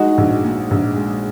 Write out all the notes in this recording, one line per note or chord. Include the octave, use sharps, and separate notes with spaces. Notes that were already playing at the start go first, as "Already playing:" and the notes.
Already playing: G#3 D#4 F#4
A#1
A#2
A#1
G#3